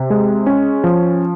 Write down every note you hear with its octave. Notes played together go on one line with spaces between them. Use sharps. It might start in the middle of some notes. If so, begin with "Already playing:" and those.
Already playing: C3
G#3
C#4
F3